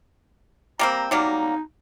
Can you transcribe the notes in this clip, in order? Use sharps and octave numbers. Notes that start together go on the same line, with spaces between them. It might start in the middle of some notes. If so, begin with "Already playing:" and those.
G3 A#3 C4 A#5
F#3 G3 A#3 D#4